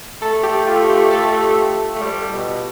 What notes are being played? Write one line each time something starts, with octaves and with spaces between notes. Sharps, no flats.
A3 A4
G4
F4
G4
A4
A3
G3
B2